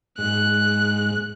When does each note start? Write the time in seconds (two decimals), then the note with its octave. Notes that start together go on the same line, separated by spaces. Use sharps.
0.18 G#2 F#6